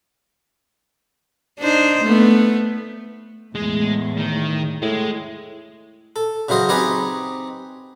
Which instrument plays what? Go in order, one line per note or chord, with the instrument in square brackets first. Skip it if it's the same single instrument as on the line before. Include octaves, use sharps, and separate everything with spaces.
[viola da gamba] D4 D#4 C5
A3 B3
[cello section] E2 A2 [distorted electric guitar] G#3
[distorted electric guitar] D#3
[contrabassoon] A2 [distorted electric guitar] G#3
[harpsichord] A4
C#3 E3 F#3 C5 D#5
C4 D#4 G4 B4 D#5 G#5